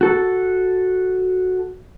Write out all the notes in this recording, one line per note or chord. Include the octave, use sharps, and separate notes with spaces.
F#4 A4